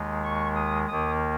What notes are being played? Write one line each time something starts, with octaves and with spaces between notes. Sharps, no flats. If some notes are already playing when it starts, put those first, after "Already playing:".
Already playing: D#2 D#3 G#3
C#6
D#6
D#2 D#3 A#3 D#6